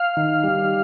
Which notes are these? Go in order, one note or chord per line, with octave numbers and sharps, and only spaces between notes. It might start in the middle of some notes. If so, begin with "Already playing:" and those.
Already playing: F5
D#3
G3